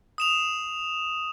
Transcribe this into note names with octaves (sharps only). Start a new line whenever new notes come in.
D#6 E7 F7